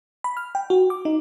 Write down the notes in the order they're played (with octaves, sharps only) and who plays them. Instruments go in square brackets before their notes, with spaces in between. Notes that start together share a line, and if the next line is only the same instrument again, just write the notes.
[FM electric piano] B5
F6
G5
F#4
D6
D#4